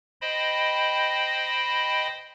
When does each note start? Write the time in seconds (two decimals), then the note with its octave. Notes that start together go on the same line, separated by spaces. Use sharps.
0.21 C5 D#5 G5 B5